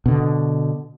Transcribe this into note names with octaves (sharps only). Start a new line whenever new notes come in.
B2 D3